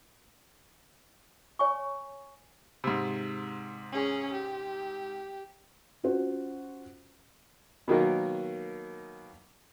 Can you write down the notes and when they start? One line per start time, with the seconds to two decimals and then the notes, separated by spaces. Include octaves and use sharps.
1.59 C#5 G#5 C#6
2.84 G#2 C3
3.92 C#4 G#4
4.33 G4
6.04 C#4 F4 F#4 C5
7.88 B2 D#3 F#3 A#3